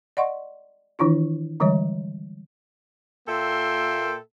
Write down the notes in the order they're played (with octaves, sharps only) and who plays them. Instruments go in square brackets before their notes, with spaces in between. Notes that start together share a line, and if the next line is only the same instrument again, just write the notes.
[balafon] D5 D#5 F#5 C6 C#6
D#3 E3 D4 E4 F4
D3 E3 G3 G#3 C#5
[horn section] A#2 A#3 A4 E5 G5 C6